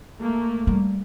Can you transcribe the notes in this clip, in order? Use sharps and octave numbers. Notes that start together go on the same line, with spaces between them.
A3 A#3
G3